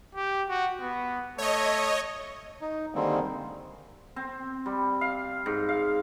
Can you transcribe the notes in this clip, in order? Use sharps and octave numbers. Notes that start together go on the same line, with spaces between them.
G4
F#4
B3
A3 C#5 D#5
D#4
D3 D#3 G3 G#3 A#3 C4
C4
G3
F5
G#2
F5